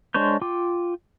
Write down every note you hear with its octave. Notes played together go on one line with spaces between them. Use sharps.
G#3 D4 C5 C#5 G6
F4 G5 D6